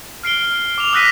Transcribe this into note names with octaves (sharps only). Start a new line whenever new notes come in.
F6 C7 D7 G7
D6 F7
D#6 E6 F#6 A#6 B6 D#7